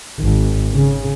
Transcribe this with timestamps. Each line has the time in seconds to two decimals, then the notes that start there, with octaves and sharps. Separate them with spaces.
0.18 G#1
0.73 C#3